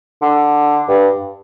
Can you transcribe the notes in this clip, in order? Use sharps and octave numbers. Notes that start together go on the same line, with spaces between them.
D3
G2